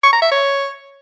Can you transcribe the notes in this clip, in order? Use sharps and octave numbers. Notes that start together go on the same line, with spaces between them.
C#6
A#5
E5
C#5